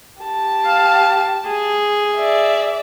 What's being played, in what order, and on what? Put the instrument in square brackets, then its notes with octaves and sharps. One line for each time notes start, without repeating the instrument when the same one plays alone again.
[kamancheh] G4 A5
[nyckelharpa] F5
G#4
[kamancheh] D5 E5